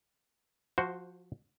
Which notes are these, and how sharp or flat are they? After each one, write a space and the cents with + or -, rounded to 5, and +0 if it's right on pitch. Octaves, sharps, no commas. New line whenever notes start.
F3 +20 F#4 +0 C5 +0